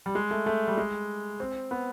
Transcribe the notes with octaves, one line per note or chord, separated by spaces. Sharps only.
G3
G#3
A3
A3
G3
G#3
C4
B3